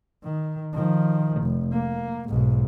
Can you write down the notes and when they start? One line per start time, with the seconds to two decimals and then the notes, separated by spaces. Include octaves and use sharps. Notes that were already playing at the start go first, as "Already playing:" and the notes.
0.23 D#3
0.73 D#3 F3
1.42 F1
1.73 A#3
2.29 B1 G#2